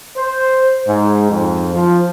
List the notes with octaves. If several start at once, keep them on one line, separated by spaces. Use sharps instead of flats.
C5
G#2
F2
F3